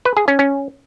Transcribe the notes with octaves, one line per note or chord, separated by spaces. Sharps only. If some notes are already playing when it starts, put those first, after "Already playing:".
B4
G#4
C#4
C#4